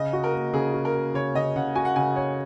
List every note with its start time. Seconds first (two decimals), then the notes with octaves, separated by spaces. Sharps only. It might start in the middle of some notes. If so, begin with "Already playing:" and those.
Already playing: C#3 D#5
0.13 F#4
0.24 A#4
0.34 A#3
0.54 C#3 G#4
0.74 F#4
0.85 A#4
0.94 F#4
1.14 C#3 C#5
1.35 C#3 D#5
1.56 C#3 F#5
1.75 F#4 G#5
1.85 F#5
1.96 C#3 G#5
2.16 C#5